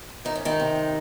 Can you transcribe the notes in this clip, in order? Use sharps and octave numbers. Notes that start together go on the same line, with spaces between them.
D#3 D#4
C#4
D#3 D#4
C3